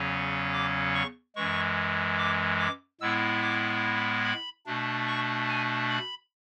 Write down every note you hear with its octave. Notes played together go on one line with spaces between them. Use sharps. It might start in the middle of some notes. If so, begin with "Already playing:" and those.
Already playing: E2 C#3 F#3 C#4
D6
C#6
F#2 E3 G#3 C#6
D6
D6
A2 G#3 B3 E4 E6
D6
B5
B2 A3 D4
C#6
G#5
B5